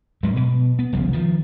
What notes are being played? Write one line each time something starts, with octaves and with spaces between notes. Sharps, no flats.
G#2 F#3 G3
B2
B3
G1 C2 C#3 F3
D#3 F3